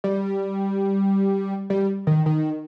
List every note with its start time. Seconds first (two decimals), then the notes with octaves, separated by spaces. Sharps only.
0.04 G3
1.70 G3
2.07 D#3
2.26 D#3